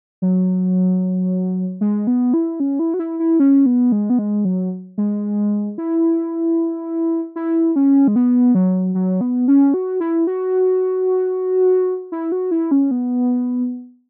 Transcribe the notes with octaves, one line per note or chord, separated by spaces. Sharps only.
F#3
G#3
B3
E4
C#4
E4
F#4
E4
E4
C#4
B3
G#3
B3
G#3
F#3
G#3
E4
E4
C#4
G#3
B3
F#3
F#3
B3
C#4
F#4
E4
F#4
E4
F#4
E4
C#4
B3